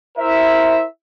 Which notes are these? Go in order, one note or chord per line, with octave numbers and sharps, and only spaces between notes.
E4 A#4 C5 E5